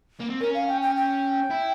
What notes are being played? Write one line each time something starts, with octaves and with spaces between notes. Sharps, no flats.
A#3
C4
C#4 A#4
F5
G5
G5
G5
E4